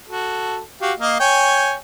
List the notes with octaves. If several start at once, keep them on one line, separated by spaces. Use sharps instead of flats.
F#4 A4
F#4 G4 F5
A#3 D#5 F5
C#5 G5 G#5